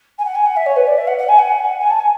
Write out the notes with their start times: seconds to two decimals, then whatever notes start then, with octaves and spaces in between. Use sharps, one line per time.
0.18 G#5
0.25 F#5
0.35 G#5
0.45 F#5
0.56 E5
0.66 C#5
0.76 B4
0.86 D5
0.97 E5
1.07 F#5
1.18 F#5
1.28 G#5
1.38 F#5
1.80 G#5
1.90 A5
2.00 G#5